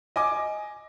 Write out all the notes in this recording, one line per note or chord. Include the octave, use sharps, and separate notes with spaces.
D#5 G#5 D6